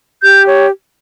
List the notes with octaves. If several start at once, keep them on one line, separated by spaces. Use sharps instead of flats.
G4 G6
C#5